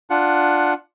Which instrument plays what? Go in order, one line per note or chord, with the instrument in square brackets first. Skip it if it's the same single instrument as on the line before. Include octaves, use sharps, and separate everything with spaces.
[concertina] D4 F4 F#5